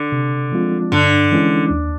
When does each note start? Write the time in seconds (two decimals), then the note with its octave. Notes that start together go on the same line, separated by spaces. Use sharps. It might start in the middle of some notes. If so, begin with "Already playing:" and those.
Already playing: D3
0.12 C3
0.52 F3 G#3 C4 F4
0.92 G2 D3
1.32 E3 G#3 C#4 E4
1.70 D#2